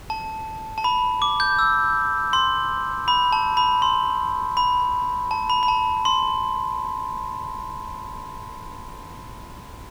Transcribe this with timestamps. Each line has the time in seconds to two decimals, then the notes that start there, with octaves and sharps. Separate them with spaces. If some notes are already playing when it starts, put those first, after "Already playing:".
0.10 A5
0.78 A5
0.84 B5
1.22 D6
1.40 G6
1.59 E6
2.33 C6
3.08 B5
3.33 A5
3.57 B5
3.82 C6
4.57 B5
5.31 A5
5.50 B5
5.63 B5
5.68 A5
6.05 C6